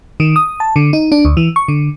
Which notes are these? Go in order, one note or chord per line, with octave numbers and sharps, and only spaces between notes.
D#3
D#6
A5
D3
D#4
D4
D2
E3
C#6
D3